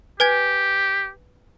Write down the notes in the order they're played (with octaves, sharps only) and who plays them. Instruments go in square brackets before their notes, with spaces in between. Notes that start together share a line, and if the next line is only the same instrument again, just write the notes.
[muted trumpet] G4 [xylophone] B4 G#5 G#6